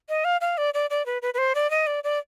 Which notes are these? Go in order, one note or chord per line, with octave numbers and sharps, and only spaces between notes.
D#5
F5
F5
D5
D5
D5
B4
B4
B4
C5
D5
D#5
D5
D5